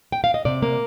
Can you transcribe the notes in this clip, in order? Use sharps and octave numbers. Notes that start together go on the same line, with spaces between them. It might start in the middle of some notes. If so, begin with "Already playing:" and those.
G5
F5
D#5
C3 D5
A#3